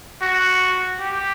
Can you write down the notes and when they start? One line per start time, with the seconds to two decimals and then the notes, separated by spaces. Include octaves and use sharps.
0.22 F#4
1.00 G4